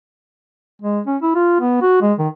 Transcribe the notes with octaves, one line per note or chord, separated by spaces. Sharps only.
G#3
C#4
E4
F4
B3
F#4
G#3
D#3